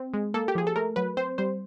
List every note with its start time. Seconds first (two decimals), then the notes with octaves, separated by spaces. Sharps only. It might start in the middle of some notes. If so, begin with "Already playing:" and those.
Already playing: C4
0.14 G#3
0.34 A#3 A4
0.48 G4
0.55 F3 G#4
0.67 A4
0.76 A3 A#4
0.96 F#3 B4
1.17 C4 C5
1.38 G3 C5